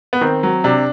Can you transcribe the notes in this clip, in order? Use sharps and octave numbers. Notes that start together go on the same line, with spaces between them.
B3
D#3 C4
F#3
C3 D4